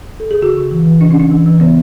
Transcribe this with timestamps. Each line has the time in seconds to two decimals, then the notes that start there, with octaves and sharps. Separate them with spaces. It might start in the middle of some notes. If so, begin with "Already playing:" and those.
0.20 A4
0.31 G#4
0.42 C#3 F#4
0.57 C#3
0.71 E3
0.86 E3
1.01 C#3 D4
1.11 C#4
1.17 C#3 D4
1.31 E3
1.46 E3
1.60 C#3 B3